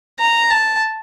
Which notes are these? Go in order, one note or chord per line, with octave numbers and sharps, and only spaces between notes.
A#5
A5